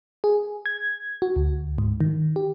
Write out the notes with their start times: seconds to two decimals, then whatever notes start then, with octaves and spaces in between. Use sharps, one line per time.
0.24 G#4
0.66 G#6
1.22 F#4
1.36 D2
1.78 G#2
2.01 D#3
2.36 G4